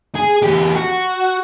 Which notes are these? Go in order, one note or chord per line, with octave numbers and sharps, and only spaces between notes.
G#4
E2 G4
F#4